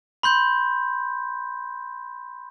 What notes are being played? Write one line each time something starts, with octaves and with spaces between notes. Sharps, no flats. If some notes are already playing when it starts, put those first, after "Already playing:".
B5 C6 G6